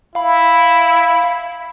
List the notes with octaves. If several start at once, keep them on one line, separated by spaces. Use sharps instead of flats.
E4 F5 B5